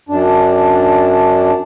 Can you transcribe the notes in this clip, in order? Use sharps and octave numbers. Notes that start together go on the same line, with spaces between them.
F#2 D4